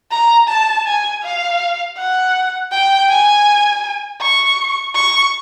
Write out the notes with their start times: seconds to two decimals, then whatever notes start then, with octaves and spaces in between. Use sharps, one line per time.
0.11 A#5
0.48 A5
0.86 G#5
1.23 F5
1.97 F#5
2.72 G5
3.10 G#5
4.21 C#6
4.95 C#6